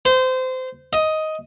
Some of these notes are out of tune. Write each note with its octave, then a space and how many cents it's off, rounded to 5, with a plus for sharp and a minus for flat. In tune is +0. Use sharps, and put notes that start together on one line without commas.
C5 -25
D#5 +10